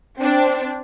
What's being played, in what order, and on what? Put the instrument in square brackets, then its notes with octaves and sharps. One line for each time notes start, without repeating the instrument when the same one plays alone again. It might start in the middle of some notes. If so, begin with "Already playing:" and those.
[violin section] C4 D4